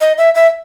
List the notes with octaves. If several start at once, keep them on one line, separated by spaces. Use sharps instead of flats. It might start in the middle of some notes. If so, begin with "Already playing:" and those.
D#5
E5
E5